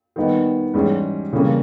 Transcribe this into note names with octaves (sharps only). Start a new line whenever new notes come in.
D#3 G3 B3 D#4
G#2 E3 G3 C#4 G#4
C#3 E3 G3 A#3 C#4